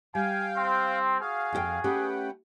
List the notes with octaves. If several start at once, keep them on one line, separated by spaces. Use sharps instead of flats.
G3 F5 G5 G#5
C4
F#4 G#4 F5
F2 G4 G5
A3 C#4 G4 B4 F#5 G5